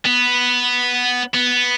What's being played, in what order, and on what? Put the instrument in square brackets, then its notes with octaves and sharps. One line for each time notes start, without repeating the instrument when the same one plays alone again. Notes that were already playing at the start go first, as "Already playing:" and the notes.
[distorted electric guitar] B3
B3